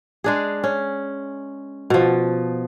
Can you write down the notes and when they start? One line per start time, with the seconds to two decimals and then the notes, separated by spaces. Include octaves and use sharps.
0.24 G#3 D4 G#4
0.64 C#4
1.90 B2 F3